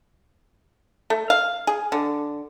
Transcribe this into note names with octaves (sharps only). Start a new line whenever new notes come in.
A3
F5
G#4
D3